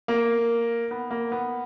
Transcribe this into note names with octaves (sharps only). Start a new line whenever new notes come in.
A#3
B3
A#3
B3